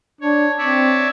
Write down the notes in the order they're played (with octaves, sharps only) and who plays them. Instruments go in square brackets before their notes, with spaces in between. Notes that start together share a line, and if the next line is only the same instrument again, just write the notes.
[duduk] D4 [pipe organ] C#5
[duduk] C4 [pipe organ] C#5 D5 E5